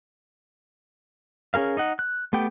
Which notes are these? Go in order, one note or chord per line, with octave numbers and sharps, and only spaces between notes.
C#4 G#4 A#4 F5
D#4 D#5 F#5
F#6
A3 B3 G4 G5